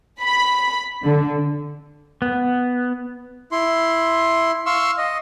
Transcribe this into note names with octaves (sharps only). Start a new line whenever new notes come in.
B5
D3
B3
E4 C6
F5 C6 C#6 E6
D#5